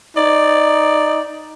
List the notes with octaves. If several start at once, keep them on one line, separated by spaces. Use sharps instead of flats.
D#4 D5